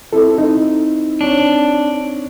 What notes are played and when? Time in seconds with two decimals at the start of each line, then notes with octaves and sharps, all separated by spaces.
0.13 C4 E4 A4
0.38 D#4
1.21 C4 D4 C#5